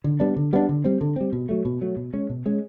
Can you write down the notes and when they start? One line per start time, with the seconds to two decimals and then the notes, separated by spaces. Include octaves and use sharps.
0.04 D3
0.20 G3 B3 D4
0.36 D3
0.53 G3 B3 D4
0.69 D3
0.84 G3 C4
1.01 D3
1.16 G3 C4
1.33 B2
1.49 F#3 A3
1.65 B2
1.81 F#3 A3
1.96 B2
2.13 G#3 C#4
2.29 B2
2.46 G#3 C#4